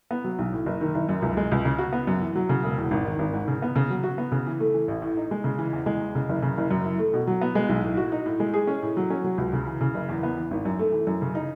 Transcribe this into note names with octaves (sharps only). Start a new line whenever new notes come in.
B3
F#3
B1
A2
F#1
D#3
F#1
F#2
C#2
G#3
C#2
C#3
F#4
B3
F#2
E3
F#3
C#3
E1
E2
G#1
D#3
G#1
G#2
C#3
B3
C#3
F#3
F#4
B3
C#3
E3
A3
E3
A1
A2
D#4
G#3
C#3
E3
E2
G#3
E2
C#3
F#1
C#3
F#1
F#2
E4
A3
B2
F#3
B3
G#3
B1
A2
F#4
D#4
A2
G#3
G#4
C#4
A2
F#3
C#4
F#3
C#2
C#3
E3
C#3
F#1
E2
B3
E3
G#1
F#2
A3
E3
F#2
C#3
D#4